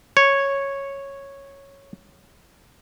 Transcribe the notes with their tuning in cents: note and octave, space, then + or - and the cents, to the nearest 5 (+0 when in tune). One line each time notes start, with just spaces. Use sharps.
C#5 -5